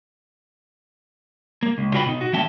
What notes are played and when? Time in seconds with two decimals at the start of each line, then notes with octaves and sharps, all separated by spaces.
1.63 A#3
1.78 C#2
1.94 C#3 F4 F#4 B4 G5 B5
2.06 B2 D#4
2.21 F#4
2.33 E3 A#3 C#4 E5 G5 A5